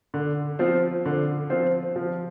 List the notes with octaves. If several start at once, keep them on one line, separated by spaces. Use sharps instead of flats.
D3
F3 C4 F4 C5
D3
F3 C4 F4 C5
F3